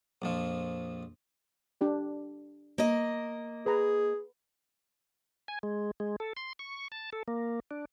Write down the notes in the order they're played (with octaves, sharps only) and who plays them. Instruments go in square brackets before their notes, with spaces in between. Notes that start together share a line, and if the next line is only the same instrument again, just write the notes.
[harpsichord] A#1 F2 F3
[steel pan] D4 G4 D5
[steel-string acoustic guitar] A#3 D#5
[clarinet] G#4 [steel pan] B4 A#5
[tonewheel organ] G#5
G#3
G#3
A4
C6
C#6
A5
A4
A#3
D4